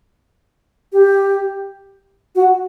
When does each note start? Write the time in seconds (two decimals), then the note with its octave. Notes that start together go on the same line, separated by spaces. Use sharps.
0.93 G4
2.35 F#4